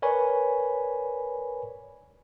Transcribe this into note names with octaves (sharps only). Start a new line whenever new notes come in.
A#4 B4 C#5 D5 G#5 B5